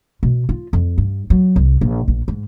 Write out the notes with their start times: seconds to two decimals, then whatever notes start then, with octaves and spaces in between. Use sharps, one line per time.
0.23 B2
0.49 F4
0.73 F2
0.98 G2
1.30 F#3
1.56 C2
1.81 A#1
2.08 A#1
2.28 G#2